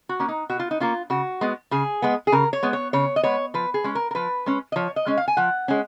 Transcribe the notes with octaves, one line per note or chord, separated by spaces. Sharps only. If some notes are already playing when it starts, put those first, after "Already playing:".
F#4
A#3 C#4
D#4
B2 F#4
F4
D#4
A#3 C#4 F4
C#3 F#4
G#3 B3
C#3 G#4
G#3 B3
G#4
C#3 A#4
C#5
G#3 B3
C#5
C#3 C#5
D#5
G#3 B3 C#5
F3 B4
G#4
G#3 C#4
A#4
A#4
F3 B4
G#3 C#4
D#5
F3 C#5
D#5
G#3 C#4
F5
G#5
F3 F#5
G#3 C#4